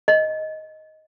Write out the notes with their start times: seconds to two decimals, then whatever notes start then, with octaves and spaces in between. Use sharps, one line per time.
0.08 D#5